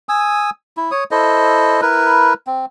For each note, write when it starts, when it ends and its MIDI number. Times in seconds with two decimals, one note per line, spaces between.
0.09 0.50 80
0.09 0.50 87
0.09 0.50 88
0.77 0.91 64
0.91 1.04 73
0.91 1.04 87
1.11 1.81 64
1.11 1.81 69
1.11 1.81 72
1.11 1.81 75
1.81 2.34 64
1.81 2.34 70
1.81 2.34 71
2.47 2.66 60